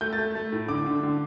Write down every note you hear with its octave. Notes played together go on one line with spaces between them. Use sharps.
A3 G6
A6
A3
A3
A2
D3 D6
D3
D3